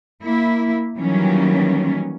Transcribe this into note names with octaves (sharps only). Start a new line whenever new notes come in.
A#3 E4
D#3 E3 F#3 G3 A#3 C#4